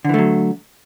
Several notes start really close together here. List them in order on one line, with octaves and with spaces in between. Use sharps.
D3 E3 A3 F#3